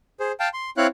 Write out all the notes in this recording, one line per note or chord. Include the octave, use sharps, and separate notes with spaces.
G#4 C5
F5 G5 A5
C6
C4 E4 C#5 F5 F#6